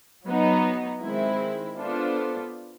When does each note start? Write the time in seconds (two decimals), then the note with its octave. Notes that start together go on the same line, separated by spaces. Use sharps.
0.25 F#3 B3 D#4
1.01 D#3 G#3 C4 E4
1.78 B3 D4 F4 A4 C5